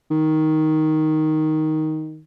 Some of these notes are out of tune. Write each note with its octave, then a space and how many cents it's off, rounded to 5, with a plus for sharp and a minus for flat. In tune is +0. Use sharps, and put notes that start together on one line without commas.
D#3 +5